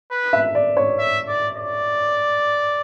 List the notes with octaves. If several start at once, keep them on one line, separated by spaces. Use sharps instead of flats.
B4
E5
D5
C#5
E5
D5
D5